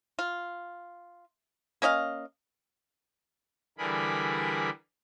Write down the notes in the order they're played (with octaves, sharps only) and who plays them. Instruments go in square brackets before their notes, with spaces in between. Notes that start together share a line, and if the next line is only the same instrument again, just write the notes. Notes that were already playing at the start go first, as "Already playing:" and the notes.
[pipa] F4
A#3 C#4 D#5 F5
[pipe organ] D3 E3 G3 G#4 A#4 B5